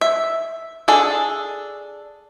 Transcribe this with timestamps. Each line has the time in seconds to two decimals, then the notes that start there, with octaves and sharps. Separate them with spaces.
0.01 E5
0.88 D4 G#4 A4